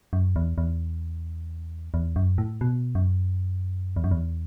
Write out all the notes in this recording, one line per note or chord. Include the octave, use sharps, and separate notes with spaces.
F#2
E2
E2
E2
F#2
A2
B2
F#2
E2
F#2
E2